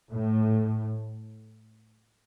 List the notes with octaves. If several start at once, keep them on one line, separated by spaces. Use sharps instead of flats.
A2